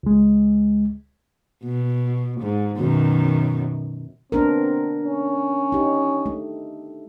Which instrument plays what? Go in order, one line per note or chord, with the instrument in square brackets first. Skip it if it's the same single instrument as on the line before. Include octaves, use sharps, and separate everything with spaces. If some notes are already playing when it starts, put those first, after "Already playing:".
[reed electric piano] C#2 G#3
[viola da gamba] B2
G#2
F#2 B2 D#3
[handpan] B3 D4 A#4 [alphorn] C4
[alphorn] C#4
[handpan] D#4 G4
A3